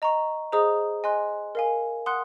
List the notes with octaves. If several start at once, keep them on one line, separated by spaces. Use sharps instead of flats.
D#5 A#5 C#6
G#4 C5 D#5 A#5 D#6
D#5 G#5 C6 F#6
A#4 F5 G#5
F#5 C6 D#6 F#6